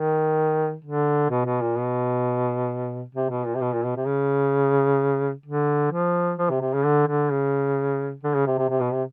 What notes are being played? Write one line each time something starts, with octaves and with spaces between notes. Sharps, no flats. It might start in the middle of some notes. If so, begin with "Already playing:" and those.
Already playing: D#3
D3
B2
B2
A#2
B2
C3
B2
A#2
C3
B2
A#2
B2
C3
C#3
D3
F3
F3
C3
C3
C#3
D3
D3
C#3
D3
C#3
C3
C3
C3
B2
C3